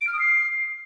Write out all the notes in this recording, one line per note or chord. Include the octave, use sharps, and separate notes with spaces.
D7
F6
D#6
C7